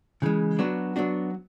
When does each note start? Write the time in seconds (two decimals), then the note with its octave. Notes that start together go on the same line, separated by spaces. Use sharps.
0.22 C#3 E3 G#3
0.59 F#3 B3 D4 F#4
0.96 F#3 B3 D4 F#4